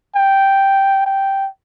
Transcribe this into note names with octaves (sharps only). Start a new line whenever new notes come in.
G5
G5